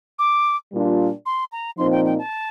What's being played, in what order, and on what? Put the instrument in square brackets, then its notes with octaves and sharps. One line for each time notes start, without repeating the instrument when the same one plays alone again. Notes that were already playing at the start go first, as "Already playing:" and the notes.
[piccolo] D6
[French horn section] A#2 G3 D4 F4
[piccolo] C6
A#5
[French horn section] A#2 F3 C4 D#4 [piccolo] C6
[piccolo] G5
G5
A5